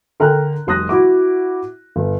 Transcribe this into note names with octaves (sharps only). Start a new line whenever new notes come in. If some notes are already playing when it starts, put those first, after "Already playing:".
D3 A#4 G5 A#5 F#6
F1 G3 C6 D#6 F#6 A#6
E4 F#4 D6
G1